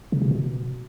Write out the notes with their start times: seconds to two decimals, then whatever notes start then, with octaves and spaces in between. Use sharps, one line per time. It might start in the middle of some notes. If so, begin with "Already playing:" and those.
0.12 C#3
0.22 C3
0.31 B2